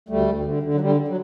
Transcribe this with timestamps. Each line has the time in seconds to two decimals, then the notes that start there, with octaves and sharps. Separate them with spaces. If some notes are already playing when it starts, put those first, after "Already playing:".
0.09 D2 G3 A3
0.27 D2
0.45 D3
0.63 D3
0.74 F#3
0.80 D3 G3
1.08 F#3